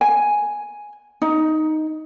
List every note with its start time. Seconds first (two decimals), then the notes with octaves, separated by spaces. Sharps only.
0.01 G#5
1.22 D#4